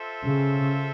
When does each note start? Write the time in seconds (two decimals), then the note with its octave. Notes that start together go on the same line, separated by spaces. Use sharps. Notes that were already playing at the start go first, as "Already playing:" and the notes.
Already playing: F4 A4 C5 E5
0.26 C#3